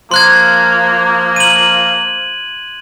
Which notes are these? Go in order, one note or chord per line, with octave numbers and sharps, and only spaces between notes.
F3 A#3 C6 F#6 G#6
D#7 F#7